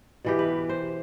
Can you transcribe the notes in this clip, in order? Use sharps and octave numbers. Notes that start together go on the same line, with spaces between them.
B2 E3 G4
B4
C5